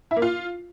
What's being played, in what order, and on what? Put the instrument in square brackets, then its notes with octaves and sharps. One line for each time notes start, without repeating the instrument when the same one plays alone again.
[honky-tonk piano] E4
A#3
F4